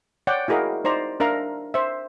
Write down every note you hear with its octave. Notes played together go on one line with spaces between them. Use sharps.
C#5 D5 F#5 G5
E4 F#4 G#4 A#4 D#5 F5
D#4 C5 D5 A#5
D4 A#4 E5 F5 A#5
C5 E5